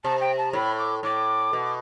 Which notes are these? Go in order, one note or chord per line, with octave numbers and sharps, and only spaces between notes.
C3 A5
G5
A5
A2 B5
D6
A2 D6
B2